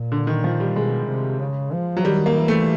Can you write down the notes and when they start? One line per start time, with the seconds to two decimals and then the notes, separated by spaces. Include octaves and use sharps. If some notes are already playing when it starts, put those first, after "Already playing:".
Already playing: A#2
0.12 D3
0.27 D#3
0.44 F3
0.60 G3
0.76 B2 G#3
1.08 C3
1.40 C#3
1.73 F3
1.97 F#3
2.05 D#3 G3
2.26 A#3
2.37 E3
2.48 A3